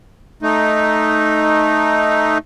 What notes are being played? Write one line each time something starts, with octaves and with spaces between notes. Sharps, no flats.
A3 D#4